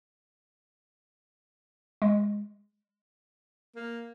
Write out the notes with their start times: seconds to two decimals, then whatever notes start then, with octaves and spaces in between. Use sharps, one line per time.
2.02 G#3
3.76 A#3